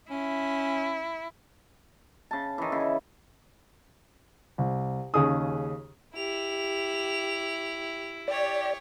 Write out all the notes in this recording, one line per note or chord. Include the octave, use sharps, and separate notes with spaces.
C#4 E4
C#3 A5
D#3 E3
C#3 E4
C2
D#2 C#3 G#4 D#6
E4 G4 F7
G4 C#5 D5